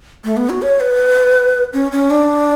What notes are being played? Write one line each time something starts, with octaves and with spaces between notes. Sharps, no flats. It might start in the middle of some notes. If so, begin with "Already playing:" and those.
A3
B3
F#4
C#5
B4
C#4
C#4
D4